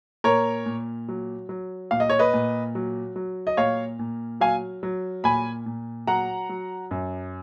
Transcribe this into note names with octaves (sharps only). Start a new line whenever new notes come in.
A#2 A#4 C#5
A#2
F#3
F#3
A#2 F5
D#5
C#5
B4 D#5
A#2
F#3
F#3
D#5
A#2 C#5 F5
A#2
F#3 F5 G#5
F#3
A#2 G#5 B5
A#2
F#3 F#5 A#5
F#3
F#2